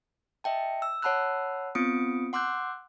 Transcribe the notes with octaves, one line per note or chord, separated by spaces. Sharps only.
D#5 E5 G5 A5
E6
C#5 F#5 A5 B5 E6 F#6
B3 C4 F4 D#6 C#7 D7
F#5 C6 D6 E6 F#6 G6